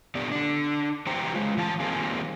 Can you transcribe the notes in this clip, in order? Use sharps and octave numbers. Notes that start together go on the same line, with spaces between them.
A#2 D3 B3 G4 D5
D3 D4
E3 G3 C5 G5 A#5
G#3 F4
A2 E3 F5 G#5 A5
D#3 G3 A#3 C4 F4 G#4